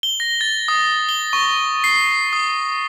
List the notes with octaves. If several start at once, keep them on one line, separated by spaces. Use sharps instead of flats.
G7
A#6
A6
D#6
G7
C#6
C7
D#6